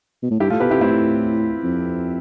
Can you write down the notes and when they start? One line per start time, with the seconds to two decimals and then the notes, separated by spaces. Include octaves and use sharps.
0.23 B2
0.31 A2
0.40 G2 E4 G4
0.50 A2 F4 A4
0.60 B2 G4 B4
0.71 C3 E4 G4
0.81 A2 C4 E4
1.64 F2